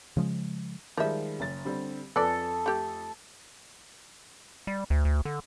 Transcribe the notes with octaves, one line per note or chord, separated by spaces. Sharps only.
C#3 F3 G#3
D#3 F3 G3 G#3 E5
F#1 A6
D3 G3 C4
F2 A4 B4 D5
A3 G4
G3
D2
D2
D3